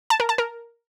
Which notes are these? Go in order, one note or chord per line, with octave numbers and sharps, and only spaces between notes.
A5
A#4
A5
A#4